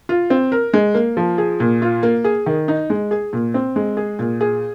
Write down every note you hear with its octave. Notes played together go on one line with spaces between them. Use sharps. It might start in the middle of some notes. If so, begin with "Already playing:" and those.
F4
C4
A#4
G#3
A#3
F3
G#4
A#2
F4
A#3
G#4
D#3
D#4
G#3
G#4
A#2
C4
G#3
G#4
A#2
G#4